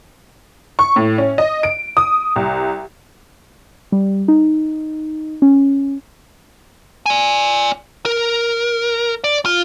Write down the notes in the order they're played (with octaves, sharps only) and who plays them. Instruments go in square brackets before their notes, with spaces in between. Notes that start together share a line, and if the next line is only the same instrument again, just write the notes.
[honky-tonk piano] C#6
A2
C#4
D#5
D7
D#6
C2
[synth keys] G3
D#4
C#4
[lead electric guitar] D5 G#5
A#4
D5
F4